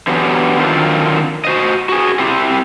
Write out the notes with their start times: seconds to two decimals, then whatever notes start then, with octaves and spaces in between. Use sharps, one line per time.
0.07 D3 E3 F#3 G3 B3 G4
0.58 D3 D#3 F3 F#3 C4 F4
1.45 F#4 C5 D#5
1.89 F#4 G#4
2.19 C4 E4 G4